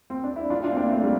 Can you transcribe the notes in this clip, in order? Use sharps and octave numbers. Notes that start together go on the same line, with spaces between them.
C4
D4
E4
D4 F4
D4 F4
C4
A#3 D4
A3 C4
G3 A#3